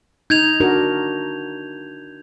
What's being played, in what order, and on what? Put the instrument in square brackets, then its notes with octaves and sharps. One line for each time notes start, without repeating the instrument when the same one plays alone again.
[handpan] D#4 [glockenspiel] G6 G#6 F7
[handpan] D4 F#4 A#4